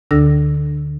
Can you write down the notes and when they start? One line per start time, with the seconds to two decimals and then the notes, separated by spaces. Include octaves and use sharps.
0.11 D2 D3 D4 A4 E6 A#6